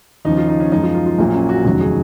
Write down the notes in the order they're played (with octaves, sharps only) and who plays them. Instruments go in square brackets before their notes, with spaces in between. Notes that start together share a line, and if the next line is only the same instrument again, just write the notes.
[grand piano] D#2 C#3 F3 D#4
F4
D#4
C#4
F#2 F3 G#3 D#4
F4
F4
F4
A#1 A#2 F#3 F4
C#4
F#4
F1 D#2 C#3 F#3 F#4
G#4